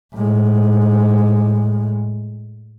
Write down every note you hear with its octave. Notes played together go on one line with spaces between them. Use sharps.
A2 G#3